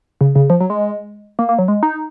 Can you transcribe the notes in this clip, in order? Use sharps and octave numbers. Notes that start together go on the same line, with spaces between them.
C#3
C#3
F3
F#3
G#3
A#3
A#3
F#3
G#3
D#4